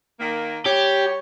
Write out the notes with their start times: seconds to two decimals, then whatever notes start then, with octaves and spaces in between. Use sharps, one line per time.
0.20 D#3 A#3
0.66 G3 G4 C#5